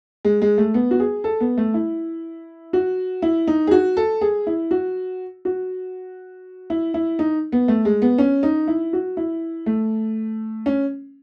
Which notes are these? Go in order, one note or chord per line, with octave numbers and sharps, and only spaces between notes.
G#3
G#3
A3
B3
F#4
G#4
A4
B3
A3
E4
F#4
E4
D#4
G#4
F#4
A4
G#4
E4
F#4
F#4
E4
E4
D#4
B3
A3
G#3
B3
C#4
D#4
E4
F#4
E4
A3
C#4